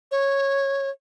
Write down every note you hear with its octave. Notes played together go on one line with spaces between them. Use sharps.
C#5